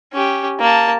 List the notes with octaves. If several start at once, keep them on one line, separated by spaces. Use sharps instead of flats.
C#4 G4
A#3 A5